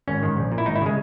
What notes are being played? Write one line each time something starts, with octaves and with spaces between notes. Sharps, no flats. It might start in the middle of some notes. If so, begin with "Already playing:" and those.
G#1 C#4
G#2 D#3
A#1
A#2
E4
G#1 D#4
E4
C#3 G#3